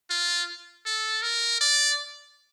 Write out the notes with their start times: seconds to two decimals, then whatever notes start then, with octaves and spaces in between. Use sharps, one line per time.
0.10 F4
0.86 A4
1.23 A#4
1.61 D5